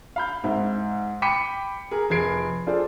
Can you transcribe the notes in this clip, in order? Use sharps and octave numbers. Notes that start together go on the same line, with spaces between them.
F5 B5 G6
G#2 C4 E5
G5 B5 D6 B6 C#7 D#7
G#4 A#4
F1 G#4 G#6 C7 D7
D4 F4 G#4 A4 C5 D5